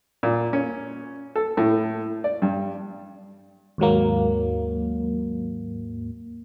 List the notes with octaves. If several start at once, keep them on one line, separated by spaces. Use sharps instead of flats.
A#2
C#4
A4
A2
D5
G2
D#2 G#2 F#3 A#3